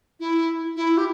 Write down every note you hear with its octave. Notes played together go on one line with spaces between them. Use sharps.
E4
E4
G4